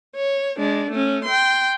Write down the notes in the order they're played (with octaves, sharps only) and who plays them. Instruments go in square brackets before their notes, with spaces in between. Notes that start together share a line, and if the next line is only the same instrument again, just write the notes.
[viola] C#5
G#3 D4
A3 C#4
G5 C6